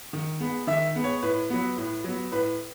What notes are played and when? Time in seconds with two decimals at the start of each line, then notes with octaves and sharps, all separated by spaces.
0.13 D#3
0.40 G#3 B3
0.67 D#3 E5
0.95 G#3 B3
1.04 C#5
1.23 A2 B4
1.50 F#3 B3
1.77 A2
2.04 F#3 B3
2.32 A2 B4